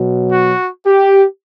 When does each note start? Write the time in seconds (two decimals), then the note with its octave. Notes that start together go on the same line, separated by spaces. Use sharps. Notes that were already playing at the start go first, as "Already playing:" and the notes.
Already playing: B2 F#3
0.31 F#4
0.85 G4